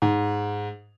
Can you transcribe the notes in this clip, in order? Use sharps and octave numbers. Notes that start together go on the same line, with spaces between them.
G#2